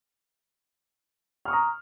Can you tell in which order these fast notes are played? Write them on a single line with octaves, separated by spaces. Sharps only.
F6 C#6 D#6 A#5